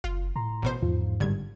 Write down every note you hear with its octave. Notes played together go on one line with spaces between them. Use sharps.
F#1 F4
A2 A#5 C6
A1 B2 C5
E2 G#2 F3 F4
G#1 G2 D3 G3 G#6